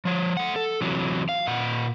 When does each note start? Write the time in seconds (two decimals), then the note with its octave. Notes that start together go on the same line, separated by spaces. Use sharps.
0.05 F3 C#5
0.37 A3 F#5
0.56 A4
0.81 C3 E3 F#3
1.29 F5
1.47 A#2 F#5